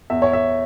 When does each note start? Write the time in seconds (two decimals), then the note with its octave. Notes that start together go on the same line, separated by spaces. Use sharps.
0.10 E2 E5
0.22 C#5
0.33 E5